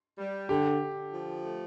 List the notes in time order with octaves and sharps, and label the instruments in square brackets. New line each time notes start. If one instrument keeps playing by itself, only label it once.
[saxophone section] G3
[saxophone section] D3 [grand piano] G4
[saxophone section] D3
F3
A3